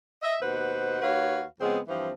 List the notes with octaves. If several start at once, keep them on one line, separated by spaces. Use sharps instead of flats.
D#5 E5
D#2 B2 B4 C5 F#5
D#2 F#4 B4 C#5 F5
F2 C#3 G#3 B3 C4
G2 E3 F3 C4